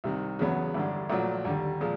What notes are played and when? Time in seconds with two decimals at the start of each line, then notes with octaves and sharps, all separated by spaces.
0.04 C2 C3 D#3
0.39 E2 C#3 F#3 B3
0.74 A1 G2 D3
1.10 A#1 A#2 F#3 A3
1.45 D#2 D3 G3
1.80 A#2 F3 G#3